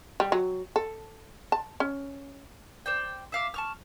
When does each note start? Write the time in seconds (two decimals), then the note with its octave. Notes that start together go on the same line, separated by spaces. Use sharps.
0.20 G3
0.32 F#3
0.76 A4
1.52 A5
1.80 C#4
2.86 C5 D5 G5
3.32 E5 F5 D6
3.54 A5 C#6 F6